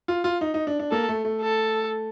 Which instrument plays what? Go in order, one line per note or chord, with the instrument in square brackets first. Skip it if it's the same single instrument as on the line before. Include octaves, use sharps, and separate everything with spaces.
[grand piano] F4
F4
D#4
D#4
D4
D4
[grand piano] A#3 [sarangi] A4
[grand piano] A3
A3
[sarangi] A4